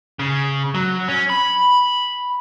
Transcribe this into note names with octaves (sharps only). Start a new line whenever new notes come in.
C#3
F#3
C#4
B5